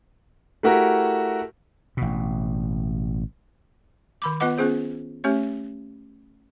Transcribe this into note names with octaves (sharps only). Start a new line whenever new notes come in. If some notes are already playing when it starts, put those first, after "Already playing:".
A3 E4 F#4 G4 A#4
A1 B2
D#3 B5 D6
B3 F4 B4 D#5 F#5 D6
B3 C#4 F4 G#4 C5
A3 C#4 G4 C#5